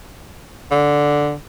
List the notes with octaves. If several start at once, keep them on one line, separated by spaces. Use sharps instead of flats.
D3